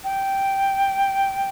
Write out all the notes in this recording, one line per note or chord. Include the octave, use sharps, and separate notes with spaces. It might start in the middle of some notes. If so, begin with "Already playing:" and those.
G5